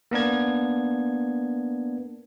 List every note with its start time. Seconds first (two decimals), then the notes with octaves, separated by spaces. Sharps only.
0.11 A#3 B3 D4 G#6